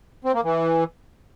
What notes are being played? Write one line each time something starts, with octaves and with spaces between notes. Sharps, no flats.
C4
A#3
E3